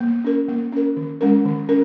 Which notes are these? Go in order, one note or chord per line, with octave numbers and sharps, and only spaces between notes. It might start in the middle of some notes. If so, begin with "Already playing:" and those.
A#3
C#4 A#4
A#3
C#4 A#4
D#3
G#3 C#4 A#4
D#3
C#4 A#4